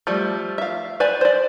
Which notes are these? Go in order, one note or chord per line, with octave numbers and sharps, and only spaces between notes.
F3 G3 A3
E5 F5
B4 C5 D5 G#5
C5 D5